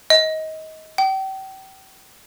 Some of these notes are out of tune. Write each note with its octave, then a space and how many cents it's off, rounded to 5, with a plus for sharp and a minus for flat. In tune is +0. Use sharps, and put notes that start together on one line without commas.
D#5 +20
G5 -35